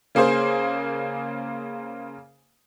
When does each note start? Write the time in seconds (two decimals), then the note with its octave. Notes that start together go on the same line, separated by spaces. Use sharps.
0.15 C#3 A#3 G#4 C5